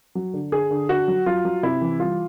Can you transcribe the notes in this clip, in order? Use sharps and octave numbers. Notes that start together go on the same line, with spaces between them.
F#3
D3
D3 G#4
D3
D3 F#4
F#3
F#3 F4
F#3
C3 E4
E3
G3 F4